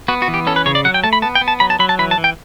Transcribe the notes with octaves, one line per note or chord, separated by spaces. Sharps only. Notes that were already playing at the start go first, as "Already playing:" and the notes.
B3 F#4
F#4
E3
G4
C#4 A4
B4
C#3 C#5
D5
F#3 F#5
G5
A3 A5
B5
B3 A5
G5
B3
A5
F#3 B5
A5
F#3 B5
A5
E3 B5
A5
E3
G5